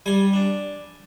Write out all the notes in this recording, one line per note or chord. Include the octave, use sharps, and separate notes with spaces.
G3 G#5
D4